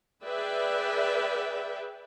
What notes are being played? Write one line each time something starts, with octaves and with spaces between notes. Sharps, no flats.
G#4 B4 D5 E5 G5